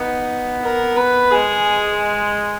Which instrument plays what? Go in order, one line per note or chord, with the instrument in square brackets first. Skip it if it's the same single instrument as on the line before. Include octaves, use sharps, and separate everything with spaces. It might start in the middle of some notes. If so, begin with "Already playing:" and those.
Already playing: [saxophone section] B3 [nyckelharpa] D#4
[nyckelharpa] A#4
B4
[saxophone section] G#3 [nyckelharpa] G#4